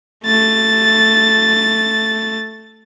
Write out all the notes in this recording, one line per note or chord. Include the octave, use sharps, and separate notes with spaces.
A3 A6